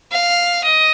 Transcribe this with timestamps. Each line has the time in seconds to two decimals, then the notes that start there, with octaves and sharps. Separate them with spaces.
0.11 F5
0.63 D#5